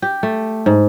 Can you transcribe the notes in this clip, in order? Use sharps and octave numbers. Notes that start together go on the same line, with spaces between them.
G4
A3
G#2